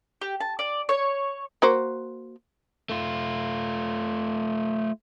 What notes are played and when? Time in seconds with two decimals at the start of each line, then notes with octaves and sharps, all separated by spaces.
0.22 G4
0.41 A5
0.59 D5
0.89 C#5
1.62 A#3 F#4 C5
2.90 A3 F4